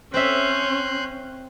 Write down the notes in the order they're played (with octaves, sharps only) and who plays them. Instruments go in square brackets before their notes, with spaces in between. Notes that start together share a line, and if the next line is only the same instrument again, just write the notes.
[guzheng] C4 E5 [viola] C#4 [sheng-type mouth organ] C6 F#6 G6